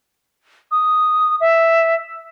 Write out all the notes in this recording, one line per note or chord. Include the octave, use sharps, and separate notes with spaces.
D#6
E5